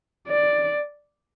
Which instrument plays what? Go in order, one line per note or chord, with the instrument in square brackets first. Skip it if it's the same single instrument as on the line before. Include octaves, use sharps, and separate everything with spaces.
[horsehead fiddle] D5